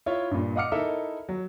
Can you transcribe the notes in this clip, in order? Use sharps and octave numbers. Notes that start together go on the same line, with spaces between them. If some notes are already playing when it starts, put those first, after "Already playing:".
E4 F4 C#5 E5
G2 A#2
D#5 F5 F#5 D6 F6 C#7
D#4 E4 A4 A#4 E5
F#3